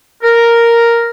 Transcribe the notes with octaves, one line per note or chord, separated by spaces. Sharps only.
A#4